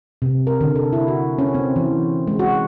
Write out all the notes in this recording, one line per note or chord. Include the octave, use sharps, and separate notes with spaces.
C3
A#4
D3
A4
E4
F#4
C#4
C4
E3
G#3
F#4